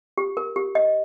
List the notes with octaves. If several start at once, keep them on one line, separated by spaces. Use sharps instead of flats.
G4
A#4
G4
D#5